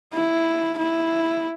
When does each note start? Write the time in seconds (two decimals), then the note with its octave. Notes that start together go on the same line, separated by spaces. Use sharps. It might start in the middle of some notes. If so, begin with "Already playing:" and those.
0.13 E4
0.78 E4